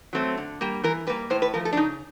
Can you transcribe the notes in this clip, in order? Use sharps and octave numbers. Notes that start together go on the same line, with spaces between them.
F#3 A3 C4
D3
G3 A#3
E3 A#4
G3 A#3 B4
A2 C5
B4
F3 A3 A#4
A4
D4
C#3 D#4